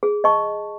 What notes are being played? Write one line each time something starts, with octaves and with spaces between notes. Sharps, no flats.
G#4
D#5 A5 C#6